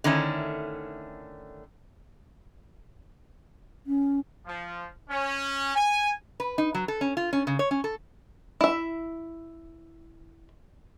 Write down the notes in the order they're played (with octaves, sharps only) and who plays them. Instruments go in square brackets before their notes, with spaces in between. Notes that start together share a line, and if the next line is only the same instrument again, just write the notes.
[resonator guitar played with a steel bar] D3 D#3 A3 C#4 E4
[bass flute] C#4
[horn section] F3
C#4
G#5
[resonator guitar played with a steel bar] B4
D#4
F#3
A4
C#4
F4
C#4
C#3
C#5
C#4
A4
[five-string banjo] E4 E5